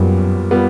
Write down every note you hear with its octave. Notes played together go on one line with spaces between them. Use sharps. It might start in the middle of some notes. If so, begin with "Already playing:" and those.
Already playing: F#2 A#2 G3 B3
A#2 G3 B3